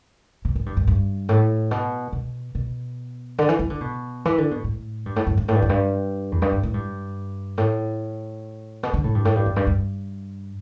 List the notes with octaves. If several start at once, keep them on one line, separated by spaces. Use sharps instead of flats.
B2
A2
G2
G2
G2
A2
B2
B2
B2
D3
E3
E3
D3
B2
E3
D3
B2
A2
G2
A2
G2
G2
A2
G2
E2
G2
E2
G2
A2
A2
G2
A2
B2
D3
A2
G2
A2
G2
E2
G2
G2